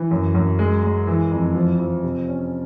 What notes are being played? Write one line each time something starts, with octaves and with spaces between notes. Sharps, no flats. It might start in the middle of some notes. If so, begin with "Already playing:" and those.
Already playing: E3
F#2
F#2
G#3
G#3
E3
F2
F3
F3
C3
C#4